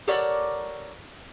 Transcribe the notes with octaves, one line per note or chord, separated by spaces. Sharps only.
G4 A4 A#4 C#5 D5 F#5